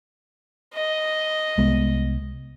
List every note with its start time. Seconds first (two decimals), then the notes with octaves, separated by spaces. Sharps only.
0.74 D#5
1.58 C2 G#3 B3